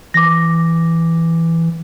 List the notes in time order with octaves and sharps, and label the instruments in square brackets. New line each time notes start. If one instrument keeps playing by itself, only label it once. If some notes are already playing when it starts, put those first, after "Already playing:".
[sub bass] E3 [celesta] D6 A#6